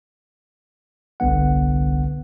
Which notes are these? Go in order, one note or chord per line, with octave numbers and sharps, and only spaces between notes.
G1 C2 D3 B3 F#5